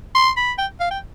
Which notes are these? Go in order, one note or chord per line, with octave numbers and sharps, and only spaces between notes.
C6
B5
G5
F5
G5